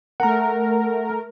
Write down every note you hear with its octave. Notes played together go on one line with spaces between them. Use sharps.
A3 A#4 F#5 A#5